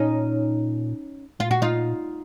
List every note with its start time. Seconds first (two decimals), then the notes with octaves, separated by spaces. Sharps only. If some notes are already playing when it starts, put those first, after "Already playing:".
Already playing: A#2 C#4 D#4
1.39 A#2 F4
1.51 F#4
1.62 D#4 F4